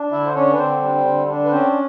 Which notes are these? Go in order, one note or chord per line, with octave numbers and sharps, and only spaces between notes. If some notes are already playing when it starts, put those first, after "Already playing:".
Already playing: D4
D3 E4 E5
C5
C#4 D4 C#5
B4
D3 C4 C5
G3
D3
D4
B4
C4 C#4 C5